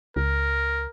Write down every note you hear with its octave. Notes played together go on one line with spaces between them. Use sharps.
C#2 A#4